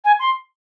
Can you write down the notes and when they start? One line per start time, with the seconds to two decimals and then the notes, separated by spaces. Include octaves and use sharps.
0.05 G#5
0.19 C6